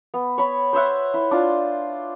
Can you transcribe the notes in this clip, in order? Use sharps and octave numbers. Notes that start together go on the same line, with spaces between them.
B3
C#5 B5
C5 C#5 E5 F#5
E4
D4 F4